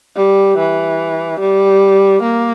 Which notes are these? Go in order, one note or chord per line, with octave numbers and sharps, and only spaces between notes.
G3
E3
G3
A#3